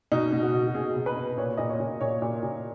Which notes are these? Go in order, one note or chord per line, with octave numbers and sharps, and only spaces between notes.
B2 D#4
B2
F#4
B2
F#4
B2 G#4
B2
B4
B2
A#2 C#5
A#2 D#5
C#5
A#2
A#2 C#5
A#2
A#2